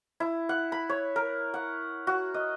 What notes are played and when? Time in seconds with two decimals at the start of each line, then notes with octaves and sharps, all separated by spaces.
0.20 E4
0.49 F#5
0.72 B5
0.89 C#5
1.16 A#4
1.54 F#5
2.07 F#4
2.34 D#5